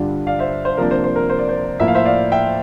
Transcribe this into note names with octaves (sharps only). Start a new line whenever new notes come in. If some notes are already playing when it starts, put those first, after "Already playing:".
Already playing: G2 D3 G3 D4 F4
D5 F5
C5 E5
C5
C3 F3 A#3 D4 A#4
C5
C5
A#4
C5
D5
C5
A2 F3 A#3 E4 E5
F5
C5 E5
D5 F5
E5 G5